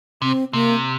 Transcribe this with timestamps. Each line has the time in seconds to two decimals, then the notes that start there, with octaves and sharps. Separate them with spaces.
0.22 C3 C4
0.53 C3 A#3